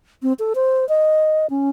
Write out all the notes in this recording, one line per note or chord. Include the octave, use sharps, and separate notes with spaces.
C4
A4
C5
D#5
C#4